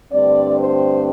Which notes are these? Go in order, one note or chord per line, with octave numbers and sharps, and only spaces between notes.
G2 D3 A3 C4 D5
C5